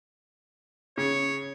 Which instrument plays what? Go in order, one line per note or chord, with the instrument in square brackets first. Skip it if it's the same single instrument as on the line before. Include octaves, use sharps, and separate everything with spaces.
[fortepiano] C#3 [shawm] C#5